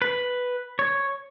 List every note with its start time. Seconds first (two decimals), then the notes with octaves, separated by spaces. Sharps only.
0.02 B4
0.79 C#5